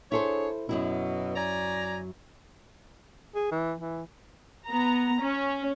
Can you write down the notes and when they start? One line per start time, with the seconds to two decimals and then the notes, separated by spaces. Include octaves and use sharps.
0.12 D4 E4 G#4 A4 C5 C#5
0.69 F#2 B2 F#3 E4
1.36 D5 G#5 A#5
3.35 G#4
3.51 E3
3.80 E3
4.67 B3 A#5
5.21 C#4